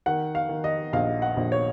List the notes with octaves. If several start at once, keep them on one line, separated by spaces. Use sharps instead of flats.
D#3 F#5
F5
D#3
D#5
A#1 F5
F#5
A#1
C#5